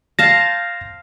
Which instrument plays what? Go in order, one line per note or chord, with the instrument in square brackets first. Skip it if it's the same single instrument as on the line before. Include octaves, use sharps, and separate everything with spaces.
[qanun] C5 F5 A5 [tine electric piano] A#6